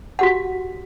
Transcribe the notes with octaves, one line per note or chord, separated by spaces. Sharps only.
F#4 G4 F#5